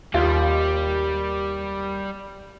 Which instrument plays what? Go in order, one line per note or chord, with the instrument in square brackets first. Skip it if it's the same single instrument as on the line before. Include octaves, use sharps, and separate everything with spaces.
[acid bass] D#2 [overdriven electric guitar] G3 [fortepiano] F4